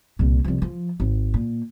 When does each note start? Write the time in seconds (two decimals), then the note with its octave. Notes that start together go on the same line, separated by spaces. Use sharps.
0.19 C2 A#2
0.44 C2 F3
0.62 F3
1.00 G#1
1.34 A#2